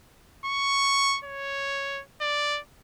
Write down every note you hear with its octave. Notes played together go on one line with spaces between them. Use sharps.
C#6
C#5
D5